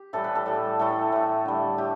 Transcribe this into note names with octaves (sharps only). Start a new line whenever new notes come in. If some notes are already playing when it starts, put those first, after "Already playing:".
Already playing: G4
A2 E3 G3 A4
B4
A4
A2 G3
A2 E3 A3 A4
A2 A3
D3 G3
A2 G4